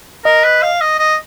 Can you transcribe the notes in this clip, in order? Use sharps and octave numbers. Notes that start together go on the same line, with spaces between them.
A#4 D#5
B4
F5
D#5
D#5